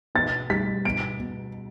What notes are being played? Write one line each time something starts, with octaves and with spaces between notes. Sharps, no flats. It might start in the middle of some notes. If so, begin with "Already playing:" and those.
B2 A6
G3 B6
B2 D7
B2